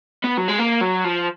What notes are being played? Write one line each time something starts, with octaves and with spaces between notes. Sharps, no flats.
B3
F#3
G#3
A#3
F#3
F3